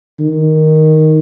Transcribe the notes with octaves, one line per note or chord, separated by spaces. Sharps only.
D#3